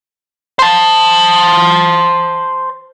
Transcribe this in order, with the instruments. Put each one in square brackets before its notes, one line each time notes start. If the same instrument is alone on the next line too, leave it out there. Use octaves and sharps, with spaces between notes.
[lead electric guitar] C5 A5